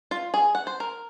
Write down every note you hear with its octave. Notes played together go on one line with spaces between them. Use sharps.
F4
G#4
F#5
C5
A#4